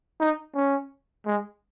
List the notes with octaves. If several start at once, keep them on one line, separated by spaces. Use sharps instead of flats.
D#4
C#4
G#3